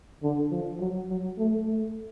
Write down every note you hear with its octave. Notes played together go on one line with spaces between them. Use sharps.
D3
F3
F#3
F#3
A3
A3